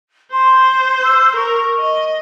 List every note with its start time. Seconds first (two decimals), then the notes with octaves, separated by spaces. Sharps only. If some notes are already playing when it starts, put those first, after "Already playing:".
0.33 C5 C6
1.04 E6
1.36 A#4 C#6
1.79 D#5